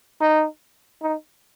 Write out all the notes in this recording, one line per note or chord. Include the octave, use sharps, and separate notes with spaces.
D#4
D#4